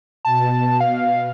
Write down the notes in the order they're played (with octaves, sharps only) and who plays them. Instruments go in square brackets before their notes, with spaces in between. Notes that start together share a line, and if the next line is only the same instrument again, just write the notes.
[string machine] B2 [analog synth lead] A5
[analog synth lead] F5